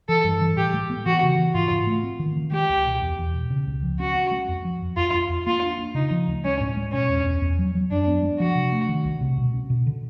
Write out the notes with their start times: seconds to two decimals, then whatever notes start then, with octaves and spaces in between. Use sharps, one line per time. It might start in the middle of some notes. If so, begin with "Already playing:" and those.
0.09 E3 A4
0.24 G2
0.41 E3
0.56 A2 G4
0.74 G#3
0.90 B3
1.06 E3 F#4
1.23 C#3
1.38 E3
1.54 G#2 F4
1.71 G#2
1.87 A3
2.03 C4
2.19 D#3
2.36 D#3
2.52 G#3 G4
2.69 C#2
2.86 B2
3.01 E2
3.18 E2
3.34 B2
3.50 C#3
3.67 C#2
3.83 F3
3.99 C#4 F#4
4.15 C#4
4.31 G#3
4.48 F2
4.65 F3
4.81 F2
4.97 F2 F4
5.14 F2
5.30 F2
5.47 A#3 F4
5.62 D4
5.78 D4
5.94 C#3 D#4
6.11 F3
6.28 D2
6.44 G#3 C#4
6.61 A2
6.77 G#3
6.92 B2 C#4
7.09 E2
7.26 E2
7.42 E2
7.59 F#3
7.75 F#3
7.90 F#2 D4
8.07 B3
8.23 G#3
8.40 F3 F#4
8.55 C3
8.72 A3
8.89 D#3
9.05 C2
9.21 C3
9.38 B2
9.53 C#4
9.70 B2
9.87 D3